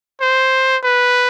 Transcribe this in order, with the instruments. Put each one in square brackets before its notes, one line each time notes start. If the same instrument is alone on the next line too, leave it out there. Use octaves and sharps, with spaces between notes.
[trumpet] C5
B4